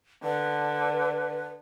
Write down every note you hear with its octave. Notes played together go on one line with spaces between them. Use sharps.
D3 B4